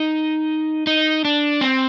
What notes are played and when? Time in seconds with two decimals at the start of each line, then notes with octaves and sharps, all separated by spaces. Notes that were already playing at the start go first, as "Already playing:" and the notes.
Already playing: D#4
0.87 D#4
1.25 D4
1.61 C4